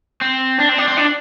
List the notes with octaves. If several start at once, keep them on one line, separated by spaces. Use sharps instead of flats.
C4
D4
C4
D4
C4
D4